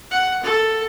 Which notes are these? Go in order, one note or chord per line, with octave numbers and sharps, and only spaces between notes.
F#5
A4